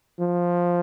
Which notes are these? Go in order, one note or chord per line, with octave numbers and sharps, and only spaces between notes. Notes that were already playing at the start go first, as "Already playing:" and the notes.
F3